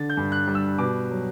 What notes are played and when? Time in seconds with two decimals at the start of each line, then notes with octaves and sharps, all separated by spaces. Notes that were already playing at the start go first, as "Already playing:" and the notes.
Already playing: D3 A6
0.10 G6
0.17 G2
0.32 F#6
0.47 G3
0.55 E6
0.78 B2 D6
1.11 F#3